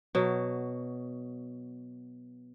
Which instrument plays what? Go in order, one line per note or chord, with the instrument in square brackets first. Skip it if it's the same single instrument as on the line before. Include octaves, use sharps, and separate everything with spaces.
[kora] B2 F#3